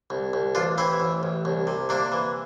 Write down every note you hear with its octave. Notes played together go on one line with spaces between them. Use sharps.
C2
C2
A1 D4 F4
E3 C4 E4
A1
A1
C2
C3
C3 A#3 D4
E3